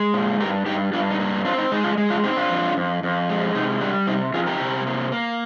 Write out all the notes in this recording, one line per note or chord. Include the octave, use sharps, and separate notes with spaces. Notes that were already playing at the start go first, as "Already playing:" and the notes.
Already playing: G#3
A#2
G2 G4 A#4
G2 D#4 G4
G2 D4 F4
D#4
A#3
C4 D4 F4
D#4
G#3 D#4
D4 F4
G#3
D4 F4
C4 D#4 G4
D4 F4
F2
F2
F2
G#3
C3 D#4
G3 D4
C3 D#4
F2 F4 G#4
G4 A#4
C3
A#3
A#3